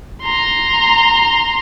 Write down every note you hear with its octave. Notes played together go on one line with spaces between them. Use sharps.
A#5 C6